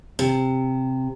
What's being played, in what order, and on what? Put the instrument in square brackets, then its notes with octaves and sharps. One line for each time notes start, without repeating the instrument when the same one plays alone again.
[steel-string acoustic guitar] C3